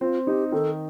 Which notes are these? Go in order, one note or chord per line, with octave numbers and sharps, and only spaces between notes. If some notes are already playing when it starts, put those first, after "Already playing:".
C4 F4
D#4 G4
D#3 A4